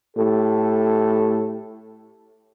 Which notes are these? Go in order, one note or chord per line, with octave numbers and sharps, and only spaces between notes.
A2 G4 A4